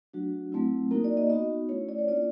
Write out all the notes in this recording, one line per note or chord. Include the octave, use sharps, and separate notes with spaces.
F#3 A3 D4 F#4
F#3 A3 C4 E4
A#3 D#4 F#4 A#4
D5
D#5
B3 D#4 F#4 D#5
A3 C#4 E4 C#5
D5
C#5
A#3 D4 F4 D5